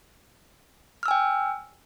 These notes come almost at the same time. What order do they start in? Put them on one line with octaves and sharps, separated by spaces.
F6 E6 G#5 G5